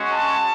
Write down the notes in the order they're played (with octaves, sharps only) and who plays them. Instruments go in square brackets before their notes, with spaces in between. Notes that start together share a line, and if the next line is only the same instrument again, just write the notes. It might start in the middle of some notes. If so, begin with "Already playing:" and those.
Already playing: [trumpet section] G#3 C#4 F#4
A5